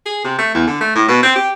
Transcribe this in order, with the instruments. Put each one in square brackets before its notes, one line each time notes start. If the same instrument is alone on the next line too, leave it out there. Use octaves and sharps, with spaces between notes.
[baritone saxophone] G#4
C3
A3
E2
D3
A3
A2
B2
C4
G4